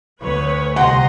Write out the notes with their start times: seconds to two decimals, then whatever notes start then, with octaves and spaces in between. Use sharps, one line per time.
0.21 D2 B4 C#5
0.76 C2 D#5 F#5 G5 A#5 C6